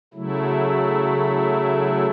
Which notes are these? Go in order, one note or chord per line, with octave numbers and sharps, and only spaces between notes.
C#3 F#3 A3 E4